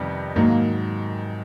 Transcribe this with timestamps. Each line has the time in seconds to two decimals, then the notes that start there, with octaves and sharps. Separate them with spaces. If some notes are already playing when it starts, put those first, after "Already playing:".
Already playing: F2 C3 D#3 G3 B3
0.35 G#2 D#3 F#3 A#3